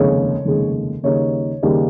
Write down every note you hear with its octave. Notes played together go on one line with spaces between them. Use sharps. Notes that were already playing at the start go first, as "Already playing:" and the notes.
Already playing: F1 D#2 C#3 G#3 C#5
F1 D#2 C#3 G#3
D#2 C#3 G3 A#3 D#4 C#5
D#2 C#3 G3 A#3 D#4